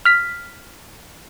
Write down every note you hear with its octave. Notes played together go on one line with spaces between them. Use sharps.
F6 B6